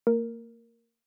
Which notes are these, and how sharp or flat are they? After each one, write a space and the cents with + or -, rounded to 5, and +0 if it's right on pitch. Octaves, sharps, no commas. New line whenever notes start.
A#3 -30 A#4 +0